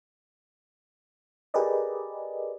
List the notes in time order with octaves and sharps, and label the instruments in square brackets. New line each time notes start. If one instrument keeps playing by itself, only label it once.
[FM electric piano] G4 G#4 A#4 B4 D5 D#5